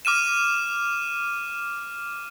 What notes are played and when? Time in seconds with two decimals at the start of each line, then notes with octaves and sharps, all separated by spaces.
0.05 D6 F6 D#7 E7